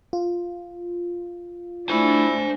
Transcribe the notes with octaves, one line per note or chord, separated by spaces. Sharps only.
F4
A3 D4 E4 C5 G#5